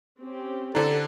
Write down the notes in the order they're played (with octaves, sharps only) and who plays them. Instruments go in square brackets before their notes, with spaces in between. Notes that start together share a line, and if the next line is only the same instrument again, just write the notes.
[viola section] C4 C#4 G4
[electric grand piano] D3 D4 [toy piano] E4 C5 A5 [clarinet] A4